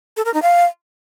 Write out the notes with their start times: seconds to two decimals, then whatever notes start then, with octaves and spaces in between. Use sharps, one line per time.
0.17 A4
0.25 A#4
0.34 D#4
0.42 F5